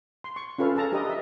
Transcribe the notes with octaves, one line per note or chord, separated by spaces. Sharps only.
C6
C#6
C#4 F4 A4 B4 F5
G#4 A4 A5 A#5
D4 G4 A#4 B4 D#5 D#6
D#5 E5